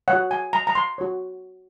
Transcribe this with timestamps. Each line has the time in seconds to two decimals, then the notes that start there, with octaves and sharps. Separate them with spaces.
0.08 C#5 F#5
0.13 F#4
0.31 G#5
0.53 A#5
0.67 A#5
0.75 C6
0.98 F#4 C#5